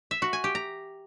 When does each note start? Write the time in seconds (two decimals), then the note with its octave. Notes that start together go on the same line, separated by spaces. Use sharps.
0.11 E5
0.22 F#4
0.33 G#5
0.44 G4
0.55 A#5